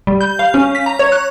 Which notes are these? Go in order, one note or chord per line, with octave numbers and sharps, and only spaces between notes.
G3
G6
F5
C#4
B6
A#5
C#5
F#6